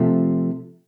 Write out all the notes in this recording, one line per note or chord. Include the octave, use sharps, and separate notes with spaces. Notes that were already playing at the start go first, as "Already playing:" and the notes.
Already playing: C3 F3 A3